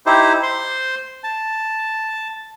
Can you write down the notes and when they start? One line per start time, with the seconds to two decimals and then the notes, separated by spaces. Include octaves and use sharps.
0.06 D#4 E4 G4 C5
0.43 C5 C6
1.24 A5